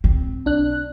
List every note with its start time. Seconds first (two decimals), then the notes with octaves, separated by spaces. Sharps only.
0.04 C4
0.45 B1 D4 F#6